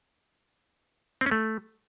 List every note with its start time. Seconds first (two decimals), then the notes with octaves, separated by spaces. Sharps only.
1.21 C4
1.26 C#4
1.31 A3